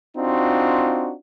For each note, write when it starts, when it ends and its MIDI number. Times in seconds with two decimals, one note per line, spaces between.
0.17 1.14 60
0.17 1.14 62
0.17 1.14 63
0.17 1.14 65
0.17 1.14 66